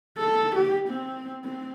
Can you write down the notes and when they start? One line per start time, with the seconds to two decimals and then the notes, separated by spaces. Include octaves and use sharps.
0.18 A4
0.56 G4
0.89 C4
1.44 C4